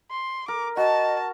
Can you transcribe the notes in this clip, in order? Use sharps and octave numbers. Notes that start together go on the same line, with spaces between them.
C6
A#4 D6
F#4 D#5 A5